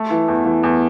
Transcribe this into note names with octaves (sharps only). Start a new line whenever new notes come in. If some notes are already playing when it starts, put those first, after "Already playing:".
Already playing: A3
E3
E2
E3
E2